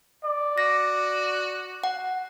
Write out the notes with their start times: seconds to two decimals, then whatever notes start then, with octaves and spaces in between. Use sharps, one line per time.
0.24 D5
0.58 F#4 A#6
1.84 F#5